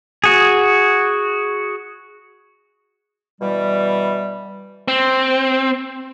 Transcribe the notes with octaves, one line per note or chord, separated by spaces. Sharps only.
F#4 G#4
B2 E3 G3
C4